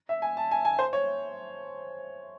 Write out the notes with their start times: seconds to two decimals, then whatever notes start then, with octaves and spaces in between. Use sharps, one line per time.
0.09 E5
0.22 G#5
0.37 A5
0.51 G#5
0.65 G#5
0.79 C5
0.93 C#5